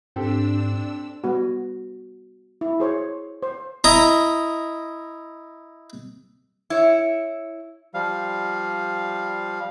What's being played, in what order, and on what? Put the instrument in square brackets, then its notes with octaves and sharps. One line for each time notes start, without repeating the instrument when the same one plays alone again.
[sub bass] G#2 [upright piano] C4 G4 A4 [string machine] D4 E6
[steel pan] G3 B3 F#4
E4
G#4 C5 C#5
C5
[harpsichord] E4 D#5 A#5
[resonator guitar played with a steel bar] E4 C#5
[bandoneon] F3 G3 F5